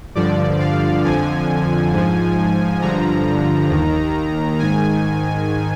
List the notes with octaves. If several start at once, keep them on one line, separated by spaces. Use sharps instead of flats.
G2 D3 F3 D5
F5
F2 D3 F3 G#5
G#2 F3
G2 D3 F3 A#5
D#2 D#3
G#2 D#3 G#5